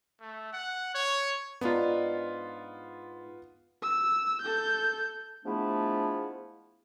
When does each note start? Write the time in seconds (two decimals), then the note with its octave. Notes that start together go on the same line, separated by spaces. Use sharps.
0.20 A3
0.53 F#5
0.95 C#5
1.61 G#2 B3 D4 D#4 F4
3.83 E6
4.42 A4 G6
5.45 F3 G#3 A3 B3 D4 E4